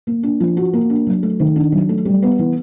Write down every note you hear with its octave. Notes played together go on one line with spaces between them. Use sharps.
A#3
D4
F3
F#4
A#3
D4
F#3
A3
D#3
D4
F#3
A3
G3
B3
E3